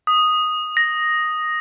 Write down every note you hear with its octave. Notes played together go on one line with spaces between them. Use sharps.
D#6
A#6